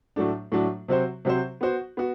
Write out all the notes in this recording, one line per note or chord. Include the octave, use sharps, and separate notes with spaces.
A2 F#3 A3 D4
A2 F#3 A3 D4
C3 F#3 C4 F#4 C5
C3 F#3 C4 F#4 C5
B3 F#4 C5
B3 F#4